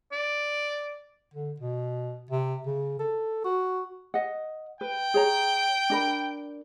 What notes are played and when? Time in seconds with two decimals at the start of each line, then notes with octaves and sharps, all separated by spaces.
0.12 D5
1.34 D3
1.60 B2
2.31 C3
2.66 C#3
2.99 A4
3.44 F#4
4.14 D#5 F#5
4.81 B4 G5
5.14 G#4 C#5 A#5
5.90 D4 A#4 B5